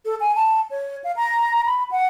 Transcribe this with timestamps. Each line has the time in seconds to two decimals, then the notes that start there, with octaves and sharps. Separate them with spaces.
0.05 A4
0.20 G#5
0.36 A5
0.70 C#5
1.04 F5
1.16 A#5
1.66 B5
1.91 F#5